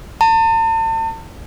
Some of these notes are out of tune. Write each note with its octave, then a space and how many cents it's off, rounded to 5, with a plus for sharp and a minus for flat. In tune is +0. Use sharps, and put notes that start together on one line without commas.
A5 +40